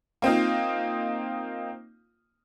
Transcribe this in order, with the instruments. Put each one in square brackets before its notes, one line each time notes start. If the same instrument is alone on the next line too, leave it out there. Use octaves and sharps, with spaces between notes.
[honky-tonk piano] A#3 C4 D#4 F4